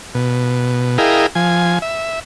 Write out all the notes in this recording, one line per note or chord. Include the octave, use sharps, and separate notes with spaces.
B2
E4 G#4 A#4 D#5 F5 G5
F3 G#5
E5